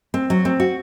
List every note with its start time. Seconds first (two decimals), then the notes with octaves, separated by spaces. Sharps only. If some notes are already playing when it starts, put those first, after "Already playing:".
0.14 C4
0.30 F#3
0.45 C4
0.60 F#4